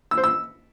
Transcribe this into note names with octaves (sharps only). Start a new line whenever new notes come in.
E6
C5
E6